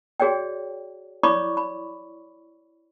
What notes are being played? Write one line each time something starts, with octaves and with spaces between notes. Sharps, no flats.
F#4 G#4 C#5 D5 G5
E4 C#5 D5 B5 C#6 D6
B5